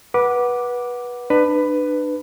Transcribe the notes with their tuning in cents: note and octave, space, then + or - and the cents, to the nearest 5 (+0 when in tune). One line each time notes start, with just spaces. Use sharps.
B4 -20 F#5 +0 D6 +0
D4 +35 B4 +10